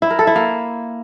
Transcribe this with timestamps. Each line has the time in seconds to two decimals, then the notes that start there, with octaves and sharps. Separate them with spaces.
0.02 E4
0.10 A#4
0.19 A4
0.27 E4
0.36 A#3